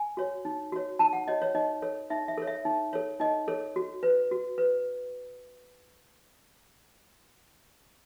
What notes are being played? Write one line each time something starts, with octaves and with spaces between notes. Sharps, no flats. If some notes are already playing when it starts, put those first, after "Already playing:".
Already playing: G#5
F#4 C#5
D#4
F#4 C#5
D#4 A5
F#5
F#4 C#5 D#5
C#5
D#4 D#5
A4 C#5
D#4 E5
E5
A4 C#5
E5
D#4
A4 C#5
D#4 D#5
A4 C#5
F#4
B4
F#4
B4